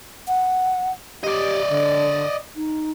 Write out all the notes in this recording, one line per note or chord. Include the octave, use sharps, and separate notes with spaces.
F#5
G4 D5 D#5
D3
D#4